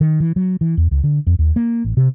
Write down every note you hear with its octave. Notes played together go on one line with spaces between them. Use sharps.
D#3
E3
F#3
E3
E2
C#2
D3
F2
D#2
A#3
A1
C3